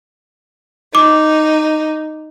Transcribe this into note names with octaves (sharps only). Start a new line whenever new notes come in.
D#4 D6